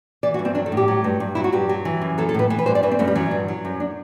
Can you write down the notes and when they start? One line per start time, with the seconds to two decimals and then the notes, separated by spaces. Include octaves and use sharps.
0.23 E3 D5
0.34 F#4
0.39 G2
0.45 C4
0.55 F#3 D4
0.66 A4
0.72 A2
0.77 G4
0.88 F#3
1.04 G2
1.20 G2
1.35 F#3 E4
1.44 F#4
1.52 G2 G4
1.69 F#3
1.85 E3
2.02 F#2
2.18 F#3 A4
2.29 A4
2.34 A2 B4
2.50 E3 A4
2.59 B4
2.66 G2 C5
2.75 D5
2.83 E3 B4
2.91 C4
2.99 F#2 A3
3.08 G3
3.15 E3 F#3
3.31 G2
3.48 F#3
3.65 F#2
3.80 D4